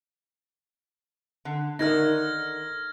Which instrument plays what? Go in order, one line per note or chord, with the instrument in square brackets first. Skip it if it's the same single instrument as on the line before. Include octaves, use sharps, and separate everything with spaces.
[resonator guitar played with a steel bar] D3
[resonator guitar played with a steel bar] D3 D#3 [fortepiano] D#4 A#4 E5 [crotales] F6 G#6 A#6